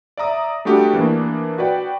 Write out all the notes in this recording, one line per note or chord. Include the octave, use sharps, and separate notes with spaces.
D5 E5 A#5 D#6
G3 A3 D4 F#4 G4
E3 A#3 D4
F#4 B4 D5 G5